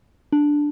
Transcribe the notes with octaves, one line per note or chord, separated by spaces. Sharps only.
D4